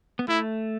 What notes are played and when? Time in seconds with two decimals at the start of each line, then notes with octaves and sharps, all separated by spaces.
0.19 B3
0.28 A3 E4